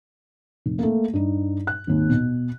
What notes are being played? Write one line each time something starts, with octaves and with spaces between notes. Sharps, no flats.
F1
A3 A#3
G2 D#4
F#6
G#1 D#2
B2